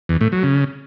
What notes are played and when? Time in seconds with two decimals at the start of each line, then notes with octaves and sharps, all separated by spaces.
0.09 E2
0.21 A2
0.32 F#3
0.44 C#3